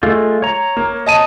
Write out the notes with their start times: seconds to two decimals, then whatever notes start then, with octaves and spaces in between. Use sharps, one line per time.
0.03 G#3 A3 F4
0.42 C#5 A#5
0.77 A#3
1.06 D#5 A5 D#7